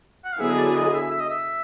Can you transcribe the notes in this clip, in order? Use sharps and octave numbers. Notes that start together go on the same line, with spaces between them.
F#5
F5
D3 F#3 B3 E4 G#4 E5
D#5
D5
D#5
E5
E5
D#5
E5